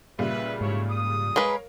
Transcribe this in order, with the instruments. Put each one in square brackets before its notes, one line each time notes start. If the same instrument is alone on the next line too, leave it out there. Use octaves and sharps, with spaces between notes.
[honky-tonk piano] A#2 C#3 G3 [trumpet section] B4 E5
[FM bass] G#2 [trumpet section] A3 E4 C#5
[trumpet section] D#6
[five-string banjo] G#3 B4 [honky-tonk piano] A#4 C#5 F5